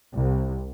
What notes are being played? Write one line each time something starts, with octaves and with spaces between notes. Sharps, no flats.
C2